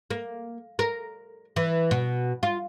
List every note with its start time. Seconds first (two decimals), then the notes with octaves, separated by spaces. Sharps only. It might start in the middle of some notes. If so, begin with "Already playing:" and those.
0.10 A#3
0.79 A#4
1.56 E3
1.91 B2
2.43 F4